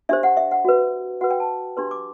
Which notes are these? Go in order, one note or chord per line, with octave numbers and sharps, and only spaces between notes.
D4 G4 C5 E5
F#5
E5
F#5
F#4 B4
F#4 B4 F#5
G5
A5
D4 G4 B4 C6
D6